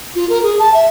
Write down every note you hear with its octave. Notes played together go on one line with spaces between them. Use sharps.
F4
A#4
G#4
A5
E5